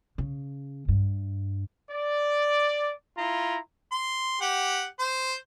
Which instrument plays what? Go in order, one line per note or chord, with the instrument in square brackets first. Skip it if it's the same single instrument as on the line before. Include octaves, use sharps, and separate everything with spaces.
[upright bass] C#3
G2
[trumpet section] D5
E4 F4 A#5
[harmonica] C6
G4 F#5
C5